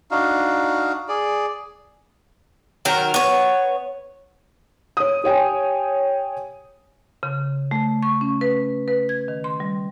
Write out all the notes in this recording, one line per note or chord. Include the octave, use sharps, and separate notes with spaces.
D4 D#4 F#4 F5
G#4 D5
D#3 F#3 A#4
B3 C#5
C#5 D#6
G4 C#5 G5 G#5
C#3
A3
C#6
C#4
B4
B4
G#6
D#3
C6
G3